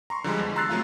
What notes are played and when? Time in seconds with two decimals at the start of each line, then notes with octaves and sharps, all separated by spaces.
0.10 A#5 C6 C#6
0.24 D3 F3 G3 G#3
0.39 E2
0.56 A#5 C6 E6 F#6 A6 C7
0.69 C3 F#3 A3 F4 F5